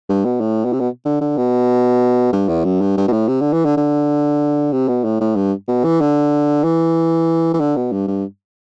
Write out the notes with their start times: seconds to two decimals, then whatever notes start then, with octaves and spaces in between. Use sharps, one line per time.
0.09 G2
0.25 B2
0.40 A2
0.65 B2
0.73 C3
0.80 B2
1.05 D3
1.21 D3
1.37 B2
2.33 G2
2.48 E2
2.65 F#2
2.81 G2
2.97 G2
3.08 B2
3.13 A2
3.28 C3
3.41 D3
3.53 E3
3.65 D3
3.77 D3
4.72 C3
4.88 B2
5.05 A2
5.21 A2
5.36 G2
5.68 B2
5.84 E3
6.01 D3
6.64 E3
7.54 E3
7.60 D3
7.76 B2
7.92 G2
8.07 G2